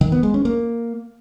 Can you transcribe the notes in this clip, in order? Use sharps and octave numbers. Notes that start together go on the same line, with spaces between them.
D#3
B3
G#3
C#4
A#3